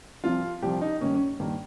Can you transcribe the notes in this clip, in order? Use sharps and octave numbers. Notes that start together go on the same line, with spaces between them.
C2 C3 F3 F4
C2 C3 F3 G4
D#4
G2 D#3 A#3 C#4
C#4
G2 D#3 A#3